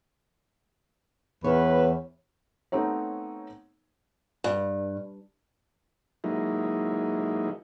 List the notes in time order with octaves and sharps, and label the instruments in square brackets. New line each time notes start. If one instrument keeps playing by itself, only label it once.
[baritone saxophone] E2 [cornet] B4 [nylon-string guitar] C#5
[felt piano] A3 B3 C4 D#4 C#5
[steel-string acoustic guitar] G2
[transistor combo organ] F#3 G#3 A#3 D#4 E4